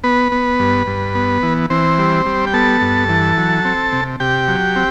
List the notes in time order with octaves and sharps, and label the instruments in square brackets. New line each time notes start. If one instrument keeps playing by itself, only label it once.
[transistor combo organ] B3 B4
B3
G2
G2
B3
E3
E3 C4 C5
G3
G3
G5
B3 A4 A5
G2
E3
F#3
C4
C3
C3 G4 G5
F#3
C4